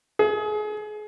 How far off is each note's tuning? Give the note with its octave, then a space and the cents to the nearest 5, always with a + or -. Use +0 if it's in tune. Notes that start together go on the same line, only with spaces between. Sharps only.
G#4 +30